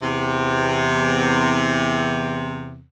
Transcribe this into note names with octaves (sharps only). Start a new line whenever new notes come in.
E2 C3